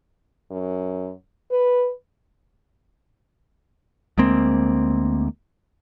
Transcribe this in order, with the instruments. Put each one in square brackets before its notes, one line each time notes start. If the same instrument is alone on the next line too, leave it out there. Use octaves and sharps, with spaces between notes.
[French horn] F#2
B4
[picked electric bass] D2 G#3 A#3 C4